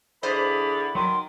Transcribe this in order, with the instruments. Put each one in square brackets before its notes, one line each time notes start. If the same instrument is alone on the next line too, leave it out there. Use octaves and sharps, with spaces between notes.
[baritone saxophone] D3 [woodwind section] E3 D5 B5 [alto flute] G#4 [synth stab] C5 D#5 D6
[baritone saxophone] D#3 [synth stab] F#3 [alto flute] C6